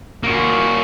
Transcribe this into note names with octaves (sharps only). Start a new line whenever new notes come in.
A#3 F#4